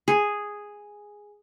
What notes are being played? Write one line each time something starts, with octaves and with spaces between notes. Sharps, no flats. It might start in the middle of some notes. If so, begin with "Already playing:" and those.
G#4